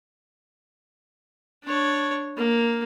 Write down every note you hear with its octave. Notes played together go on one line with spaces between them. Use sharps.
D4 C#5
A#3